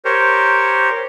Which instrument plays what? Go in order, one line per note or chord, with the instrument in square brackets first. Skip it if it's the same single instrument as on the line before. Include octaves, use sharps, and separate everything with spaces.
[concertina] G4 A#4 C5 C#5